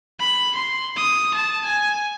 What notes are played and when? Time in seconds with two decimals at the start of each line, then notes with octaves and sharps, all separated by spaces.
0.20 B5
0.55 C6
0.97 D#6
1.35 A5
1.65 G#5